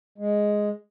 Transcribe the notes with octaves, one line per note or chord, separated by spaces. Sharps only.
G#3